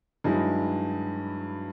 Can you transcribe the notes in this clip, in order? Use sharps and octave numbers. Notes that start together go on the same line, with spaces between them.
G2 D#3 F#3 G#3 D#4 E4